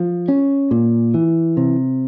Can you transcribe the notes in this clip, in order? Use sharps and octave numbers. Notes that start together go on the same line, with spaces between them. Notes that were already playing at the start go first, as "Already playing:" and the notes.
Already playing: F3
C#4
A#2
E3
C3